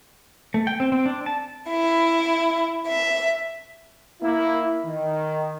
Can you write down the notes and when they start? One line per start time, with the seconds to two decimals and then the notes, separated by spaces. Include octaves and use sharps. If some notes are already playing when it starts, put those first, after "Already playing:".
0.54 A3
0.67 G5
0.80 C4
0.92 C4
1.06 D4
1.26 A5
1.69 E4
2.86 E5
4.22 A#3 E4
4.86 D#3